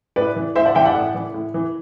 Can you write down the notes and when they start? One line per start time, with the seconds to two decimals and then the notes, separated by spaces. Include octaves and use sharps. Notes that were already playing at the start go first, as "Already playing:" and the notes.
0.16 A2 B4 D5
0.36 E3
0.55 A2 C5 E5
0.65 D5 F#5
0.75 E3 E5 G5
0.86 D5 F#5
0.94 A2
1.14 E3
1.34 A2
1.54 E3